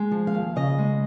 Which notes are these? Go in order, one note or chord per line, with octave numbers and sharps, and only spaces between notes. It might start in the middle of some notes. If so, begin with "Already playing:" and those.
Already playing: G#3
F3
F5
D#2
C#3 D#5
G#3